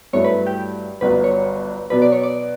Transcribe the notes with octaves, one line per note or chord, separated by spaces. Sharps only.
G2 F#3 A3 E4 C#5
B4
G4
G1 G2 F#3 B3 B4
C#5
B2 F#3 B3 D4 B4
D5
C#5
D5